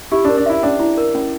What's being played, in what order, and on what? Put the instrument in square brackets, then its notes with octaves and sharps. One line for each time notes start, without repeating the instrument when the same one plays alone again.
[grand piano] E4 [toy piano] G4
[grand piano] D4
[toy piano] A#4
[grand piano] D4
[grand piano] E4 [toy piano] E5
[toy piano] C#4 [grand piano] D4
[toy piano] E4
A#4
C#4